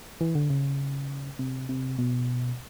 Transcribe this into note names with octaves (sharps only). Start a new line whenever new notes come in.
E3
D3
C#3
C3
C3
B2